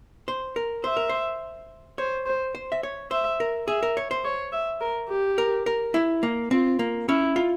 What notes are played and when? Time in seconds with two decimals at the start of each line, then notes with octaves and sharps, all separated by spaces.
0.28 C5
0.56 A#4
0.84 C5 E5
0.97 A#4
1.09 C5
1.98 C5 C#5
2.26 C5
2.55 C5
2.72 E5
2.83 C#5
3.11 C5 E5
3.40 A#4
3.67 G#4 E5
3.83 A#4
3.97 C#5
4.11 C5
4.24 C#5
4.53 E5
4.81 A#4
5.09 G4
5.38 A#4
5.66 A#4
5.94 E4
6.23 A#3
6.51 C4 F4
6.79 A#3
7.09 C#4 E4
7.36 F4